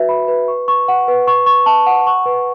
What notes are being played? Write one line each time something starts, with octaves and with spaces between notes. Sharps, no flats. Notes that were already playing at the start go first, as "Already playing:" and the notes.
Already playing: F#4 B4 E5
B5
B4
C#6
C#6
F#5
B4
C#6
C#6
A5
F#5
C#6
B4